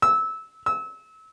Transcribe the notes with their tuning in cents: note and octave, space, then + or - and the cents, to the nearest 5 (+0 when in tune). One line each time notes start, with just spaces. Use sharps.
E6 -20
E6 -30